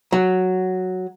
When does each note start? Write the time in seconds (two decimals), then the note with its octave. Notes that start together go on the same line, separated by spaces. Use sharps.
0.12 F#3